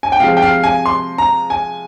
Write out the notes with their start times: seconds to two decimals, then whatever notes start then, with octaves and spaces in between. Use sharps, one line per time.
0.03 G#5
0.12 G5
0.20 C3 F3 G#3 F5
0.37 G5
0.43 F5
0.64 G#5
0.86 C6
1.18 A#5
1.50 G#5